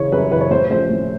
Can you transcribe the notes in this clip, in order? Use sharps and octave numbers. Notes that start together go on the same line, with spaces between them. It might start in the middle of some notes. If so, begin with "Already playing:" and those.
Already playing: C#3 E3 C#5
F#2 B4
C#3 E3 B4
C#5
A2 C5
F3 A3 C#4 C5
A2